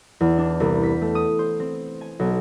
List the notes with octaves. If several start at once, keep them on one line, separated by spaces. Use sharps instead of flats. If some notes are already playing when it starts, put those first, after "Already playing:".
E2
D4
C2
B6
A3
D#6
C5
C4
G#5
B1